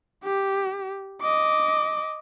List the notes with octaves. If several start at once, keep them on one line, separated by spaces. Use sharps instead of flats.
G4
D#5 D6